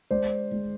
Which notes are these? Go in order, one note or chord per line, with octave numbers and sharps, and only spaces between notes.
G#3 C5 D5
G#3